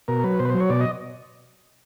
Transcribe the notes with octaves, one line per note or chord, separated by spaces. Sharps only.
B2 A#4
F#3 B4
B2 C5
B4
C5
F#3
C#5
B2 D5
D#5